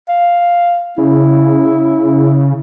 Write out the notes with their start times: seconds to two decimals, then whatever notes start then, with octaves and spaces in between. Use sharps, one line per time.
0.09 F5
0.98 C#3 E4